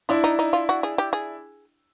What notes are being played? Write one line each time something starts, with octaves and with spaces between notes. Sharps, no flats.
D4 E4 F4
D#4
D#4
F4
F#4
G#4
G4
G#4